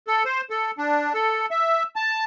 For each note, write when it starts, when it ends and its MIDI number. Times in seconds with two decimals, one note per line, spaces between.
0.07 0.23 69
0.25 0.41 72
0.50 0.71 69
0.78 1.13 62
1.14 1.46 69
1.51 1.83 76
1.96 2.24 81